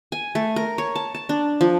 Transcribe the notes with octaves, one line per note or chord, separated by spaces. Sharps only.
G#5
A3
A#4
C#5
A5
A5
D4
F3